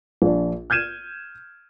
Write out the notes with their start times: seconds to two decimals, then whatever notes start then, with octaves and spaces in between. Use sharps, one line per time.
0.22 A#1 D4
0.70 F6 G6 G#6 D#7 E7